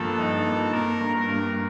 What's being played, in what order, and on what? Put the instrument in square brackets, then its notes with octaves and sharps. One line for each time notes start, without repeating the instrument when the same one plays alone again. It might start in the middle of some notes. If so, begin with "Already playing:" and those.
Already playing: [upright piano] G2 F3 A#3 [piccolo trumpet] A4
[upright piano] D#4
A#3
[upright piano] A#3 [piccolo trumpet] A#4
[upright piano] G2
[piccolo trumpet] A#4
[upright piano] G2